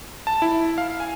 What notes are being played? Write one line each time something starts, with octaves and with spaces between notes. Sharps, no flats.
A5
E4
F5
G#5